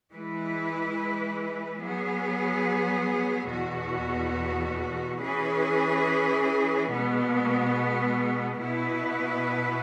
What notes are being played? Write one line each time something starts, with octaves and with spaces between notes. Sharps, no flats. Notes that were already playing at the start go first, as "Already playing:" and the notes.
E3 G#3 E4 B4
F#3 B3 G#4
E2 B2 B3 F#4
E3 C#4 G#4 B4
B2 G#3 B3
B2 B3 E4 B4